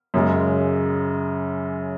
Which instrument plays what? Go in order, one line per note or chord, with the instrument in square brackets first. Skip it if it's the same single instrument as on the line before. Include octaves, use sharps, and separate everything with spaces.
[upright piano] F#2 C#3 G#3